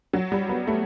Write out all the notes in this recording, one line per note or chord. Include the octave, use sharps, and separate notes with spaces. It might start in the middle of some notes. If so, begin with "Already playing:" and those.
F#3
G3
B3
A3